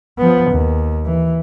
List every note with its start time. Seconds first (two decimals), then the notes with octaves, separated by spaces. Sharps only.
0.19 F3 B3
0.50 D#2
1.05 E3